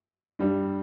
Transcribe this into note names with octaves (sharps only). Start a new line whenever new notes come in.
G2 G3 D4